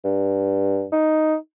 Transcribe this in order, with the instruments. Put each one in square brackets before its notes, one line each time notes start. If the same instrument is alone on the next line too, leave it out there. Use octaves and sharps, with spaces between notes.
[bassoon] G2
D#4